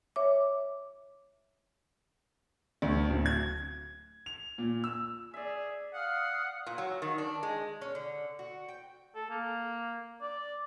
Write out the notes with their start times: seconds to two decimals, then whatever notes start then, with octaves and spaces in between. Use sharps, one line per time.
0.16 C#5 E5 D6
2.82 D2
3.10 D1
3.26 G#6
4.26 F7
4.58 A#2
4.84 E6
5.34 G#4 D5 E5
5.93 F5 F#5 D#6 F6
6.66 A#2
6.78 F#3
7.02 D#3
7.18 D4
7.43 G#3
7.81 C#4
7.95 D3
8.39 F#4
8.68 G5
9.16 A4
9.30 A#3
10.22 D5